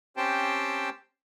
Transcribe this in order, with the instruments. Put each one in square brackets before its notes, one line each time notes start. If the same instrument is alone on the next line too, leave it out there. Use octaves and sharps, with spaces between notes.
[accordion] C4 C#4 G4 C5 G5 A5